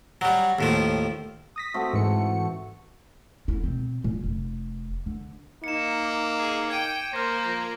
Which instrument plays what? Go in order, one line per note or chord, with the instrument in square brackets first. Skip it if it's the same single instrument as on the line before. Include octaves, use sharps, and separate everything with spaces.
[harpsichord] F#3 G3
D#2 A2 F3
[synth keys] D#6 A#6 B6
[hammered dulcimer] A3 C4 F#4
[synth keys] G#2 E3 C#7
[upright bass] D3 E4
B2 C4
A#2
F1
D3
[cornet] A#3 [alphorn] D#4 [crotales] C#7 E7
[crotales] D6
[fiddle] G#4
[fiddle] G5 [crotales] G#6 D#7
[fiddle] A#3 [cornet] C5 [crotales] F6 A#6
[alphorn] F3 [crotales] A#6